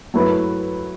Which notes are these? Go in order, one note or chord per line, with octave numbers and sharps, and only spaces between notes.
F#3 A3 E4 B4